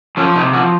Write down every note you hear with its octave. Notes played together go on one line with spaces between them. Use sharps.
F3 C#4
C3 D#4
F3 F#4